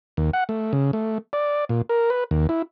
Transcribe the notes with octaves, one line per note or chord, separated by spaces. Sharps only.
D#2
F#5
A3
C#3
A3
D5
A#2
A#4
B4
D#2
E4